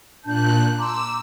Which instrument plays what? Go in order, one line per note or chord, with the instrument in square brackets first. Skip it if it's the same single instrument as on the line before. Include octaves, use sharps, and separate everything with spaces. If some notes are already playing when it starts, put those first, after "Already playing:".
[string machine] A#2 F#6 [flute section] D4 A5 G6
[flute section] A#5 C6 D6 [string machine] E6